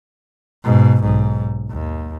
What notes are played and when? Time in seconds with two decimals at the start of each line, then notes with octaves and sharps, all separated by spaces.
0.64 G#2 B2
1.02 B1 G#2
1.70 D#2